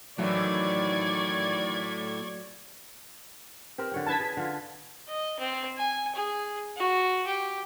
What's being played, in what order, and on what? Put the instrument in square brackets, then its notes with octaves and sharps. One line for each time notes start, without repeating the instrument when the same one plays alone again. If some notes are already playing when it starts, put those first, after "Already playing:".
[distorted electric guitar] A2 [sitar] D#3 E3 [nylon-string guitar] F#3 [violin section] D5 C#6 G#6
[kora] C4 G4 A#4
D3 C#5 G5
[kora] C#4 E4 B4 [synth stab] A5 G#6 B6
[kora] G#4
D3 F4
[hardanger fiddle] D#5
C4
G#5
G#4
F#4
G4